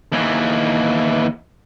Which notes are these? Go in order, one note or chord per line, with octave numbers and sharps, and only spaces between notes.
D#2 E3